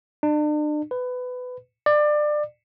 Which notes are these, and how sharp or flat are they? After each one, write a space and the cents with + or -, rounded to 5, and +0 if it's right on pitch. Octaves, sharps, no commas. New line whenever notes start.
D4 +40
B4 +20
D5 +25